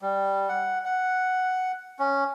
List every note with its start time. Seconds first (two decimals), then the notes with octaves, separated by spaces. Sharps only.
0.02 G3
0.49 F#5
0.85 F#5
1.99 C#4